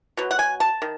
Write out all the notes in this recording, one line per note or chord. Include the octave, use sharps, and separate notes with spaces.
B2 F#3
F#5
G#5
A5
D#3